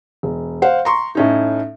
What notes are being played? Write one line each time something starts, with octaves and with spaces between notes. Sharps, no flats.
E1
C5 F5 F#5
A#5 C6 C#6
A2 C#4 D#4